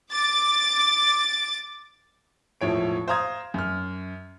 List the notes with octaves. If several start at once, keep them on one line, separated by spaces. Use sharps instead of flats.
D6 A6
E1 A2 F3 C#5 D7
C5 F5 A#5 D#6 G#6
F#2 F6